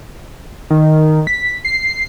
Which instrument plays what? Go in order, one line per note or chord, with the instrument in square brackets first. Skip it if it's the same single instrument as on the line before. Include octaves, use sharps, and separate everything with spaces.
[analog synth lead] D#3
B6
C7